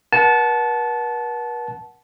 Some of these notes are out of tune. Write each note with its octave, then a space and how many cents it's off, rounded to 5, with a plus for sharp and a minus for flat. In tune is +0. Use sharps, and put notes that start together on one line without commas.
B4 -45 F#5 +0 A5 -20